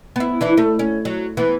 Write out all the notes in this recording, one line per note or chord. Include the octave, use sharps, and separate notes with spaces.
B3 E4
E3 D4 E4
A3
C#4
F#3
E3 B3